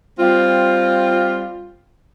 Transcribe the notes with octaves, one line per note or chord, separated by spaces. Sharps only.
G3 C4 F4